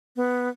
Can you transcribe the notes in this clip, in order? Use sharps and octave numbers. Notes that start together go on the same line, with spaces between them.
B3